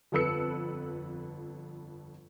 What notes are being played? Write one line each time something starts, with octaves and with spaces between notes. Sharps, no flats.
G1 F2 A4 B4 E6 C#7